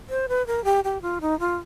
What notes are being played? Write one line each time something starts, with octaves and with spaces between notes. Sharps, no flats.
C5
B4
A#4
G4
G4
F4
D#4
F4